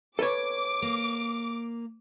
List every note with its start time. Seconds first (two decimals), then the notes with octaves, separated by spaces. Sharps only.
0.19 A4 B4 C#5 D6
0.82 A#3